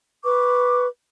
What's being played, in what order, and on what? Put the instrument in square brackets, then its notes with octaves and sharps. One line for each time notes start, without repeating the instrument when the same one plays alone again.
[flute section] B4 C#6 D6